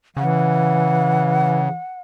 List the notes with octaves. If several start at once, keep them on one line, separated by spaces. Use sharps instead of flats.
C#3 E3 F#5